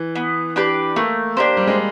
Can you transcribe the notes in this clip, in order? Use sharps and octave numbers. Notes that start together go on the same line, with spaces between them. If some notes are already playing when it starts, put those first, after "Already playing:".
Already playing: E3
B3
D4 G4 B4
A3 A#3
A#3 D4 G4 C5
G3
G#3